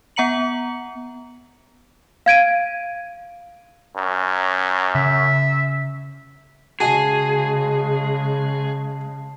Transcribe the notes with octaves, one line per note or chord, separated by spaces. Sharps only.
B3 F#5 A#5 C#7 F#7
F5 G#6 D7 D#7
F#2
C#3 E5
C#3 G#3 F#4 G#4 D#5 A5 C7